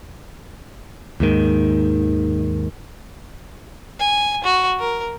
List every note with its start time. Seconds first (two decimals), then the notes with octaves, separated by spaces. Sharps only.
1.20 D#2 G#2 D#3
3.99 G#5
4.44 F#4
4.79 A#4